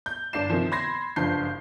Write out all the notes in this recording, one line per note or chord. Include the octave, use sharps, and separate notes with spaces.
G6
G1 D4 D5 C7 E7
C3 D#3 F3
B5 C6 G#6 A#6 C7
F#1 G2 F3 A5 G6 C7